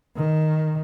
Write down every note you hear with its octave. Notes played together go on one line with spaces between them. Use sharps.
D#3